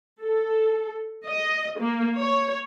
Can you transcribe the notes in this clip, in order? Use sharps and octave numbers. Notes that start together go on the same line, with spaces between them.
A4
D#5
A#3
C#5